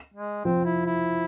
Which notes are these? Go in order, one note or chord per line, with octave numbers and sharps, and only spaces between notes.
G#3
F3 C4
E4
E4